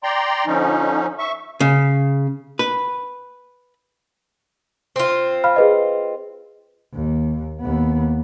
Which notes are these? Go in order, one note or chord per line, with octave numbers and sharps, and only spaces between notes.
D5 G5 A#5 C6
D3 F3 C#4 D#4
E5 C#6
C#3
B4
C4 F4
F5 B5 F6
G#4 B4 D#5
D#2
D#2 B3